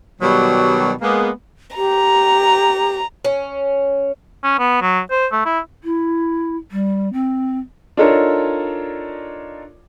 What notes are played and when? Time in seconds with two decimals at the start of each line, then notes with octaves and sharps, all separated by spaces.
0.21 B2 D#3 F#3 G3
1.02 G#3 A#3 B3
1.77 G4 A#5
3.25 C#4
4.44 C#4
4.59 B3
4.82 F#3
5.11 C5
5.32 A3
5.45 E4
5.84 E4
6.71 G3
7.13 C4
7.97 D4 D#4 F4 A4 A#4 C#5